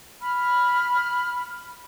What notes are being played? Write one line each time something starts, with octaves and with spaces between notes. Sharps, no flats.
B5 F6